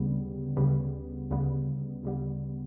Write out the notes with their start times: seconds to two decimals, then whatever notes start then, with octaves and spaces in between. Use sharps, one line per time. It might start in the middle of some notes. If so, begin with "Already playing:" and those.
Already playing: D2 C#3 G3 B3
0.57 D2 C#3 G3 B3
1.31 D2 C#3 G3 B3
2.03 D2 C#3 G3 B3